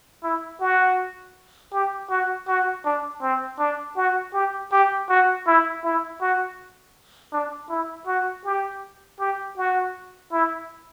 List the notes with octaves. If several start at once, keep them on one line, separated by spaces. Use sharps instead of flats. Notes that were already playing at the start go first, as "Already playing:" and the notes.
E4
F#4
G4
F#4
F#4
D4
C4
D4
F#4
G4
G4
F#4
E4
E4
F#4
D4
E4
F#4
G4
G4
F#4
E4